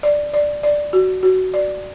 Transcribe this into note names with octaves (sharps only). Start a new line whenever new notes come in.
D5
D5
D5
F#4
F#4
D5